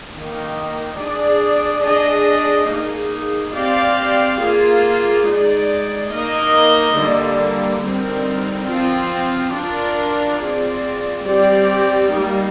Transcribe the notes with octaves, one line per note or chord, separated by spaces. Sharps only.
D#3 A#3 D#4
D4 G#4 D5
D4 G#4 D#5
A#3 D#4 G#4
C4 G4 D5 F5
A#3 F4 G#4
G#3 D#4 G#4 D5
A#3 D#4 A#4 D#5
D3 G3 A#3
D3 G3 C4 D#4 A#4
F3 C4 F4
D4 F4 A#4
C4 F4 G#4 D5
G3 C4 G4 D5
G3 A#3 D#4